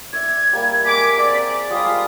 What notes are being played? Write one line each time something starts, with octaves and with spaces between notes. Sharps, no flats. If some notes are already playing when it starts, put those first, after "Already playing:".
D5 E5 G#6
G3 A#3 A#4
G#3 F#5 G#5 D6 B6
C4 G#4 D5 F#5
G3 G#3 F4 D#6